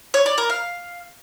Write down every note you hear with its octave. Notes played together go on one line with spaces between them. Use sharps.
C#5
D5
A#4
F5